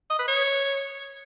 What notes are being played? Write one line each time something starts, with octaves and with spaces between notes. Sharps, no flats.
D#5
B4
C#5